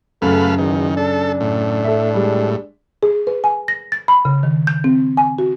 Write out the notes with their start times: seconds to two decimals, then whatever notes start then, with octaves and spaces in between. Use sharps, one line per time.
0.22 F#2 C#3 A3 A4 B4 F5
0.58 E2 D#3
0.97 D4 A4
1.41 A2
1.84 A4 E5
2.14 G3 G#3
3.03 G#4
3.27 B4
3.44 G#5
3.68 A#6
3.92 A6
4.08 B5
4.25 C#3
4.43 D#3
4.67 G6
4.84 C4
5.17 G#5
5.38 F#4